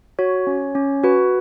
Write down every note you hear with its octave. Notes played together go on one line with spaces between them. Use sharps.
F#4 C#5
C#4
C#4
F#4 B4